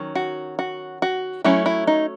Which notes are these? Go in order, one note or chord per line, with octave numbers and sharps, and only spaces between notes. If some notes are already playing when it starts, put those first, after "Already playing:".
Already playing: D#3 F#3 C#4
F#4
F#4
F#4
F#3 A3 C#4 E4
E4
D#4